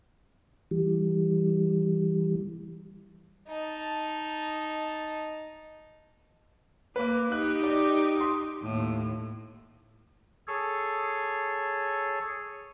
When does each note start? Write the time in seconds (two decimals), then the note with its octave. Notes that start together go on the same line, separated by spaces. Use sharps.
0.71 E3 G3
3.48 D#4 A5
6.96 A#3 B4 D6
7.32 D#4 G4 F#6
7.63 D5 D6
8.17 C6 D#6
8.62 D#2 A2
10.48 G#4 A4 C#5